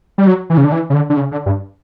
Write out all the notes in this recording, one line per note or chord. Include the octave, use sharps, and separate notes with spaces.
G3
F#3
E3
C#3
D3
E3
C#3
D3
D3
C#3
D3
G2